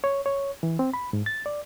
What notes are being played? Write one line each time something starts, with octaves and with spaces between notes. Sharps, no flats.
C#5
C#5
E3
C4
B5
G#2
A6
D5